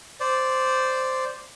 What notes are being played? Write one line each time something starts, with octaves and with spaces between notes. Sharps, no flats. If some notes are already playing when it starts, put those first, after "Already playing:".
C5 D5